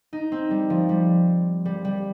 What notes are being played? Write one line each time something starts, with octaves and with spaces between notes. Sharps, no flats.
D#4
C4
G3
F3
G3
G3
G3